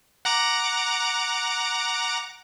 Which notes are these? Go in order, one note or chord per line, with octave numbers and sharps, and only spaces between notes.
F#5 A#5 D6